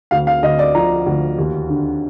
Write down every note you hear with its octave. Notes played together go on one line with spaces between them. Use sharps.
D2 F5
F5
D2 D#5
D5
F3 A#5
D2
D#2
D3